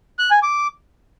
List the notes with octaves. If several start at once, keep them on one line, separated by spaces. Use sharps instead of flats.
F#6
G#5
D6